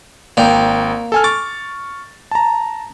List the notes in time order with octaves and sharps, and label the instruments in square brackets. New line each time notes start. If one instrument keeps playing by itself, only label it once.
[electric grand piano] G#1 G5 [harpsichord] A#3 D5
[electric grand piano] A4 G#5 F6
[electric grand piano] C#6 F6 A6 [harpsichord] D6
[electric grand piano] A5 A#5